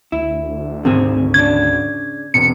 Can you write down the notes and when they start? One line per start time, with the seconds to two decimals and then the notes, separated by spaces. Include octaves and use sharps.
0.12 D2 E4
0.85 G#1 C3 C4 G#4
1.34 C#3 D4 G#6
2.34 E1 C3 C#7